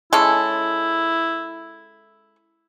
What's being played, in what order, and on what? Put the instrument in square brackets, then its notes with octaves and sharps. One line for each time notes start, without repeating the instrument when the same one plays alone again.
[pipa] G#3 C#4 A4 [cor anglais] E4